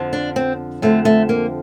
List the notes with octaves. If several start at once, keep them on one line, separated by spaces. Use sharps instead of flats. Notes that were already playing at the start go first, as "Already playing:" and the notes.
Already playing: F2 D3 F3
D4
C4
F2 D3 F3 A3
A3
A#3